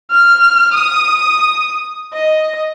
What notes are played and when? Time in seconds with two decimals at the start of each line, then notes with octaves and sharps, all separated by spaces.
0.11 F6
0.73 D#6
2.13 D#5